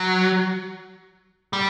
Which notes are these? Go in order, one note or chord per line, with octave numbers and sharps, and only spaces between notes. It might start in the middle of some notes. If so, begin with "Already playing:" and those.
Already playing: F#3
G3